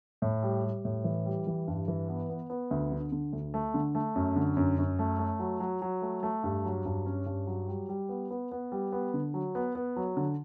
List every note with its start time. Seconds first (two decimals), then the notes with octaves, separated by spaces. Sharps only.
0.22 A2
0.43 G3
0.64 G3
0.85 A2
1.04 E3
1.26 G3
1.47 E3
1.68 G2
1.88 E3
2.08 B3
2.29 B3
2.50 B3
2.71 D2
2.92 D3
3.12 D3
3.33 D2
3.54 A3
3.74 D3
3.95 A3
4.16 F#2
4.36 D3
4.57 F#2
4.78 F#2
4.99 A3
5.19 A3
5.40 F#3
5.60 F#3
5.82 F#3
6.02 A3
6.23 A3
6.44 G2
6.65 F#3
6.85 G2
7.06 C#4
7.26 G2
7.47 F#3
7.68 G3
7.89 G3
8.09 B3
8.31 B3
8.52 B3
8.72 G3
8.92 B3
9.14 D3
9.34 F#3
9.55 B3
9.75 B3
9.96 F#3
10.17 D3